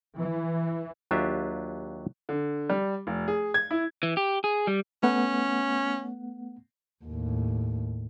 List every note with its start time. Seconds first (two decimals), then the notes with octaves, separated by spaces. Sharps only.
0.17 E3
1.11 D#2 F#3 D4 F4 G4 E5
2.29 D3
2.70 G3
3.07 F1
3.28 G#4
3.54 G#6
3.71 E4
4.03 E3
4.17 G4
4.44 G#4
4.67 G3
5.03 A3 B3 C#4 F#5
7.05 D#2 A2